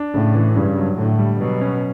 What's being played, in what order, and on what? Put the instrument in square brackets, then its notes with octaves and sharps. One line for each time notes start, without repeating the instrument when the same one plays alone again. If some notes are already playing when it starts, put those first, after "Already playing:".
Already playing: [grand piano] D4
[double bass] A2 [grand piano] C#3
[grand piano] E3
[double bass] G2 [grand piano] C#3
[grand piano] F#3
[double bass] A2 [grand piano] D3
[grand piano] G3
[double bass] B2 [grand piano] F#3
[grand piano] C#4